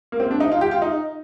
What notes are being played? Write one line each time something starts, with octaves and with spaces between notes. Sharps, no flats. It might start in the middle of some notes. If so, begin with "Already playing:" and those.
A#3
C4
D4
D#4
F4
G4
F4
D#4